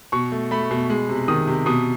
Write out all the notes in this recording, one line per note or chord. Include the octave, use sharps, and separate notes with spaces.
B2 C#6
A3
A3 B5
B2
G#3
C3
D#3 D#6
C3
B2 D#6